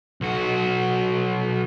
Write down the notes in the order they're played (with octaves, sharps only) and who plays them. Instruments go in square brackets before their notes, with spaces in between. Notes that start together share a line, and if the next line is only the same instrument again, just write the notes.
[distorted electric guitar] B1 F#4